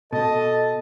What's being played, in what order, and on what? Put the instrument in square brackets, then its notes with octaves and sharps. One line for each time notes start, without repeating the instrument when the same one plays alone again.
[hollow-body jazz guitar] B2 [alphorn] A4 [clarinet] D#5 [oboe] A5